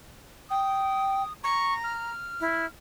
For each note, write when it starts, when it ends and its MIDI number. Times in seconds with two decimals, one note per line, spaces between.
0.50 1.22 79
0.50 1.33 87
1.43 2.12 82
1.43 1.73 85
1.83 2.66 89
2.41 2.66 64